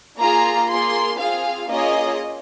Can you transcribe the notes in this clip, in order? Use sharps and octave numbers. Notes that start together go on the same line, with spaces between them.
A#3 F4 G#4 A#5
A#3 F4 G#4 C6
C4 F4 G#4 F5
A#3 C#4 F4 G#4 D#5